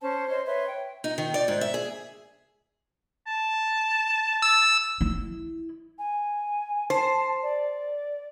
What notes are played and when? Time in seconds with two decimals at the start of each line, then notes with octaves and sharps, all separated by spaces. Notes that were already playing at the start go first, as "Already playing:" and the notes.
0.02 C#4 C5 A5
0.28 C5 C#5 D#5 C6
0.46 B4 C#5 E5 C6
0.68 G5
1.04 D#4
1.18 D#3
1.34 D5
1.48 G#2
1.61 E5
1.74 G#4
3.26 A5
4.42 E6
5.01 E4
5.99 G#5
6.90 C5 A5
7.43 D5